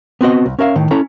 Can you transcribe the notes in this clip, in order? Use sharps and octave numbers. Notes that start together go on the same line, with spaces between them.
B3 C4 F#4 D#5
C2
C#4 A#4 E5 F5
A2 D#3
C#4 E4 A4 A#5